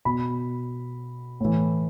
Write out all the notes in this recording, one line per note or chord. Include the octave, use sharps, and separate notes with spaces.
B2 B5
A2 E3